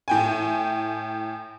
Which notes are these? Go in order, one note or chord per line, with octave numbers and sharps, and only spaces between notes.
A2 G5 G#5